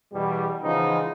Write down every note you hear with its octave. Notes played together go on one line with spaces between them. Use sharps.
E2 B2 G3
C#3 E3 F3 G#3 B3 D#4